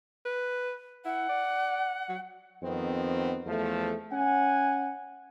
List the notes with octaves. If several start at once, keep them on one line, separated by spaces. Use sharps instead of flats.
B4
E4 F#5
D5
F#3
F2 D#3 B3 C4
E2 F3 A3
C#4 F#5 G#5